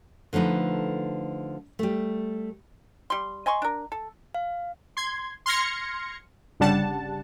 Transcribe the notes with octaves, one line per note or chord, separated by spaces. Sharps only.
D3 F3 A3 D#4 B4
G3 A3
G3 C6
D#5 G#5 C6 C#6
D4 A#4
A4
F5
C6 G#6
C6 F6 G#6 A#6 C#7
G1 C#3 G3 D4 F#5 A5